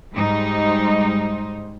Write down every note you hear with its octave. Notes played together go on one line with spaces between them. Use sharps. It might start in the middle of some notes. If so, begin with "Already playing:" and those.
G#2 G3 D#4 C5